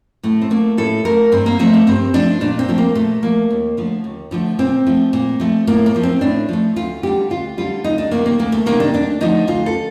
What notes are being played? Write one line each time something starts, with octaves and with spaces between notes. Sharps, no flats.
A2 A3
C4
A3 A#3
A2 A4
A3 A#4
G2 C4
A#3
F3 A3 C4
A#3
G2 C4
F3 A3 D4
A#2 D4
C4
F3 A3
A#3
A#2 A3
F3 A3 A#3
D#2
D3 F3 A3
D#2
D3 F3 A3
A#2 C4
F3 A3
A#2
F3 A3
A2 A#3
A#3
F3 A3
C4
A2 D4
F3 A3
D2 F4
D3 G3 G4
D2 F4
D3 G3 F4
D2 D#4
D4
C3 D#3 A#3
A#3
D2 A#3
A3
C3 D#3 A#3
D4
D2 D4
D3 F3 A3 D#4
D2 F4
A4